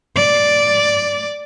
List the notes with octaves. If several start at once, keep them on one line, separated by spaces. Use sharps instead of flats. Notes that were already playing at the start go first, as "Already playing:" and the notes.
D5